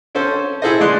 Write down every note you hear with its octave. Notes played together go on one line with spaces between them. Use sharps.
C4 C#4 A4 C5
E4 G#4 A4 C5 D#5
G#3 D5 C6 F#6